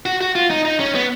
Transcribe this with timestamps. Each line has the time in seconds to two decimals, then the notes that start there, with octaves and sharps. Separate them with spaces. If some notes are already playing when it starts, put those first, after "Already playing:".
0.06 F#4
0.21 F#4
0.35 F4
0.50 D#4
0.65 D#4
0.80 C#4
0.95 B3